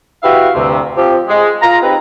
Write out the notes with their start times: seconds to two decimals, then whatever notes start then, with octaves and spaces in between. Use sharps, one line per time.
0.23 E4 F#4 G4 B4 E5 F5
0.55 D2 G2 C3
0.97 F3 C4 G4
1.28 G#3
1.62 F4 A#5
1.82 C4 D#4 G4 B4